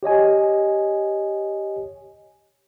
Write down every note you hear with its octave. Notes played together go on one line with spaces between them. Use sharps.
G4 C#5 D#5 G#5